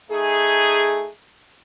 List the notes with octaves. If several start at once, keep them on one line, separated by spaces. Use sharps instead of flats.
A3 D#4 G#4